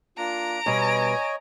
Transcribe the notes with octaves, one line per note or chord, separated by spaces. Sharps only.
A#3 D4 F4 A#5 D7
B2 G3 C#5 D#5 G#5